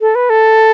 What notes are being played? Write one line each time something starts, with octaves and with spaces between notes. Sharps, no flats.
A4
B4
A4